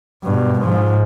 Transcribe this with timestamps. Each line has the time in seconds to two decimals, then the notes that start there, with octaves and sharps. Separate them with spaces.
0.23 G2 B2
0.61 G#2 F3